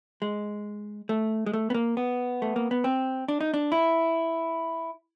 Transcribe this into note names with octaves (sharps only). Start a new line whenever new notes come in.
G#3
A3
G#3
A3
B3
A#3
B3
A3
A#3
B3
C4
D4
D#4
D4
E4